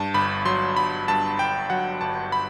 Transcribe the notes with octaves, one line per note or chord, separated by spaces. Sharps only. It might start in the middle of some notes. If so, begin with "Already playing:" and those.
Already playing: G2 A5
G1 B5
F#3 C6
G1 B5
G2 A5
G1 G5
F#3 F#5
G1 A5
B5